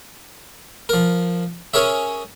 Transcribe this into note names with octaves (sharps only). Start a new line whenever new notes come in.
F3 A#4
C#4 G#4 A#4 C#5 E5